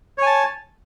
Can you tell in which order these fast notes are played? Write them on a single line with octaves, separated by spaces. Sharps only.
C#5 G#5 A5